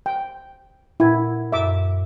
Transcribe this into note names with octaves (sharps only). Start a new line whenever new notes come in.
G5
A#2 E4 F#5 G#6
F#2 E5 D6